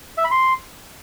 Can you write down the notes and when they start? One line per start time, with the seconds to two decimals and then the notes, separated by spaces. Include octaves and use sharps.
0.18 E5
0.24 B5
0.31 C6